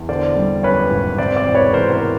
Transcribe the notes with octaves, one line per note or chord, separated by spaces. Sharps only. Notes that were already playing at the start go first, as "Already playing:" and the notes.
Already playing: E2
D3 C5 D5
G3
F#2 B4 C#5
G#1
C3 C5 D5
C5 D5
E1
B4 C#5
E2 A#4 C5
A#4 C5